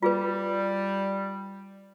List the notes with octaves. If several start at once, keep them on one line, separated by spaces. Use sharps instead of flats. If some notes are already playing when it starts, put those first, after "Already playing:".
G3 F4 G#4 B4